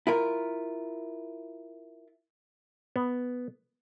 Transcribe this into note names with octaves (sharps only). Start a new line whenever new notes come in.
E4 F4 A#4
B3